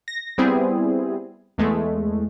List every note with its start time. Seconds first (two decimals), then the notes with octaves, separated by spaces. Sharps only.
0.08 A#6
0.38 G3 B3 C4 E4 G#4
1.58 E2 G#3 A3